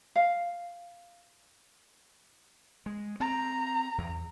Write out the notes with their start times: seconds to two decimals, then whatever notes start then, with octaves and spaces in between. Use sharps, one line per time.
0.15 F5
2.86 G#3
3.20 C4 A#5
3.98 E2